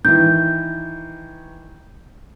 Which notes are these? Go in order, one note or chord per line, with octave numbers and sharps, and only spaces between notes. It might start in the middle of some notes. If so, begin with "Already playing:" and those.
D#3 E3 G6